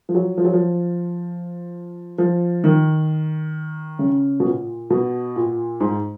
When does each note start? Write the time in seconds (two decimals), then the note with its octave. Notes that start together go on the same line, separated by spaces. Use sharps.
0.09 F3
0.15 F#3
0.37 F3
0.44 F#3
0.53 F3
2.18 F3
2.64 D#3
3.99 C#3
4.40 B2
4.45 A#2
4.90 B2
5.36 A#2
5.80 G#2